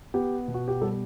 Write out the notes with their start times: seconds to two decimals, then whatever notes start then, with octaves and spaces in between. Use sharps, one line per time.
0.14 B3 G4
0.48 B2
0.54 F#4
0.68 G4
0.81 G3 A4